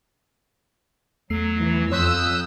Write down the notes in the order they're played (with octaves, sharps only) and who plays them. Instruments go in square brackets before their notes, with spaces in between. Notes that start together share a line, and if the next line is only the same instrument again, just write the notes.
[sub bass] E2 [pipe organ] F#3 [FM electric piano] A3 C7
[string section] E3
[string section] F2 E6 [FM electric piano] C#5 C6 B6 [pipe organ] D#6 F#6 G6